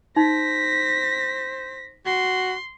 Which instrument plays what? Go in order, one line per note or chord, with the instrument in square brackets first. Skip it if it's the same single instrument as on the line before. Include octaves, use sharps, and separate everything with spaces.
[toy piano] D#4 [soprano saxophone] C5 [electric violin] A#6 B6
[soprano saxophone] F#4 [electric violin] C6